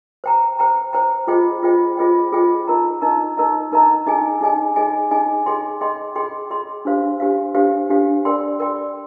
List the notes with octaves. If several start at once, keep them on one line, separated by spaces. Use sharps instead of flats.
C5 G5 A#5
C5 G5 A#5
C5 G5 A#5
F4 G#4 C5 D#5 G5
F4 G#4 C5 D#5 G5
F4 G#4 C5 D#5 G5
F4 G#4 C5 D#5 G5
D#4 A#4 D#5 A#5
D#4 A#4 D#5 A#5
D#4 A#4 D#5 A#5
D#4 A#4 D#5 A#5
D#4 G#4 D#5 G#5
D#4 G#4 D#5 G#5
D#4 G#4 D#5 G#5
D#4 G#4 D#5 G#5
G#4 D#5 G5 C6
G#4 D#5 G5 C6
G#4 D#5 G5 C6
G#4 D#5 G5 C6
D4 G4 C5 F5
D4 G4 C5 F5
D4 G4 C5 F5
D4 G4 C5 F5
A#4 D5 G5 C6
A#4 D5 G5 C6